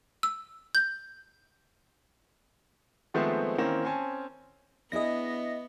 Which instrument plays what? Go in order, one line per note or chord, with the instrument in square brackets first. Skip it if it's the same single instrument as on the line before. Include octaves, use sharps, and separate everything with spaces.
[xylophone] E6
G6
[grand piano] D#3 F3 G#3 A3 B3 C4
D#3 E3 A#3 C4 C#4
C4 C#4 G#5 A5
[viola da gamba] B3 [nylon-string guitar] D4 E4 G#4 [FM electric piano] D#5 A#6